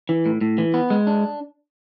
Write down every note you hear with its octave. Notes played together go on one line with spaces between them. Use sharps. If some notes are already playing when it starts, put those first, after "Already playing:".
E3
A2
A2
E3
B3
G#3
D4